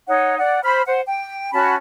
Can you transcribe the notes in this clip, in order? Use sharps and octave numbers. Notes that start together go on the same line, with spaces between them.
D#4 C#5 F#5
D5 F#5
C5 B5 F6
C5 F#5
G5
C#4 F#4 A5 B5